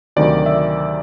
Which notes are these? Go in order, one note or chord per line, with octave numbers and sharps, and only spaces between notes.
D2 C3 D#3 F#3 D5
E5